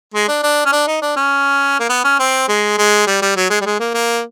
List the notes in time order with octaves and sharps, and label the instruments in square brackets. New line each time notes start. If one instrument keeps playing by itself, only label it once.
[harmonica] G#3
D4
D4
C#4
D4
D#4
D4
C#4
A#3
B3
C#4
C4
G#3
G#3
G3
G3
F#3
G#3
G3
G#3
A#3
A#3